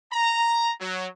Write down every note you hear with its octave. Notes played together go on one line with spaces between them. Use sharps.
A#5
F#3